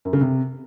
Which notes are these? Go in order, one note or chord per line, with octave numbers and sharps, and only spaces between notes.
F#2
C#3
C3